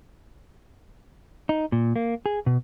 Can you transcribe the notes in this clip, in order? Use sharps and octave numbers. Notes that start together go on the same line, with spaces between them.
D#4
A#2
A#3
G#4
B2